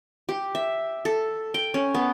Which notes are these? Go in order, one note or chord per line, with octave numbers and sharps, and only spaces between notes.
G4
E5
A4
G5
C#4
B3